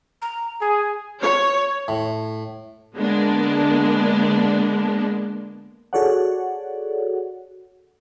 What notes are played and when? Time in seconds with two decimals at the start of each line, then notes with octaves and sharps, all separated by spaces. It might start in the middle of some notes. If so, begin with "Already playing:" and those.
0.22 A#5
0.62 G#4 G#5
1.23 C#5
1.88 A2
2.95 D3 G#3 A#3 B3 D4
5.93 F#4 G#4 A4 C#5 D5 F#5